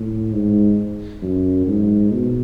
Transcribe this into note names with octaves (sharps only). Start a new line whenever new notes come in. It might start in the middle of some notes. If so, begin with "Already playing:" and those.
Already playing: A2
G#2
F#2
G#2
B2